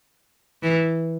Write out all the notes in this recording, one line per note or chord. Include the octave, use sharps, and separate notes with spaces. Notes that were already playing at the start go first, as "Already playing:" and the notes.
E3